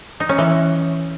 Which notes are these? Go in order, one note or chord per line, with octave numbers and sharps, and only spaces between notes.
D#4
C#4
E3